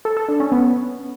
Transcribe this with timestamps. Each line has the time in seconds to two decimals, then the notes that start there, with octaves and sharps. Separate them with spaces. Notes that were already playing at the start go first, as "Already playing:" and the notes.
0.05 A4
0.17 A4
0.28 D4
0.40 C#4
0.52 B3